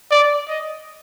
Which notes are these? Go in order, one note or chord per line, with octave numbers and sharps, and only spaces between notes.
D5
D#5